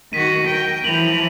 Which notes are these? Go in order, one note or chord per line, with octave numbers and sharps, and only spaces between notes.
D#3 F#4 B6 D#7
A#4 G5
E3 F3 F7 F#7